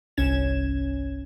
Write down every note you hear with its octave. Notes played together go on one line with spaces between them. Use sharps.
G1 C2 C#4 G#6 E7